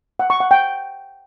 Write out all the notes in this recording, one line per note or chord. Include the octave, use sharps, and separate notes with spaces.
F#5
C#6
F#5
G5